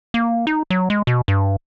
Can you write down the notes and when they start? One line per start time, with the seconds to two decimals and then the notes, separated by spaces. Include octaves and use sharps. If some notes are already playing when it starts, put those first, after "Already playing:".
0.14 A#3
0.47 D#4
0.70 F#3
0.90 G#3
1.07 B2
1.28 G2